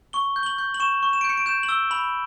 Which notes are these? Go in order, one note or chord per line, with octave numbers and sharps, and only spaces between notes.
C#6 G7
G6
G7
F#7
G6
F#7
C#6 E7
C#6
E7
D7
G6 C#7
D7
G6 E7
F#7
E6 G7
B5 F#7